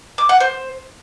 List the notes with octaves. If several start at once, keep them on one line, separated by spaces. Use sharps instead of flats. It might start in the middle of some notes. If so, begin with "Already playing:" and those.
D6
F#5
C5